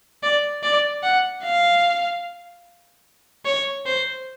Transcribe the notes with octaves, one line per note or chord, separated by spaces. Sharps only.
D5
D5
F#5
F5
C#5
C5